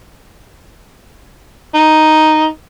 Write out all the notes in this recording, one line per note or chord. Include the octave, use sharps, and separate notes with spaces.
D#4